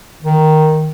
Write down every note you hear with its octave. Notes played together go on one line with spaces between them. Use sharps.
D#3